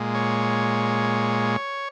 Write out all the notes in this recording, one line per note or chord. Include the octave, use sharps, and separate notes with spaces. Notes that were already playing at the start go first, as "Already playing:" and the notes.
Already playing: A#2 G#3
C#5